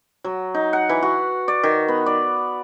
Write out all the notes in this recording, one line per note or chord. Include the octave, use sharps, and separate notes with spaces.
F#3
D#4
F#5
E3
F#4
D5
D#3
B3
D5